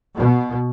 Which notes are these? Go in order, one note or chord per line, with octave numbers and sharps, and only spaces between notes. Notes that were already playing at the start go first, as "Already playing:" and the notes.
B2